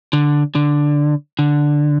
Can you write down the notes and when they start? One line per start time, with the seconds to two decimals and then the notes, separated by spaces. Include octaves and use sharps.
0.13 D3
0.55 D3
1.39 D3